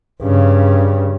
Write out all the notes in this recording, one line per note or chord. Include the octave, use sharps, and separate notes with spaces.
G2 C#3